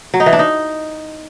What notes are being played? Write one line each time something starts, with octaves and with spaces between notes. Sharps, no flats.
F#3
D#4
E3
D4
D#4